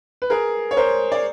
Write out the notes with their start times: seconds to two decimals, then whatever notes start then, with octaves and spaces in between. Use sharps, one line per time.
0.22 B4
0.30 G#4 A#4
0.71 C#5
0.77 A#4 C5
1.12 D5